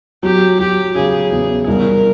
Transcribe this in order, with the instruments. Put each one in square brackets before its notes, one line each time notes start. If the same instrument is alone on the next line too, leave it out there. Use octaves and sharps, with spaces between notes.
[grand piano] F#3 [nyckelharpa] G4
[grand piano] F#3 [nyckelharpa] G4
[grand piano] C#3 [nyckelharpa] G#4
[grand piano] E2
[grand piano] C2 [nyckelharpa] A#4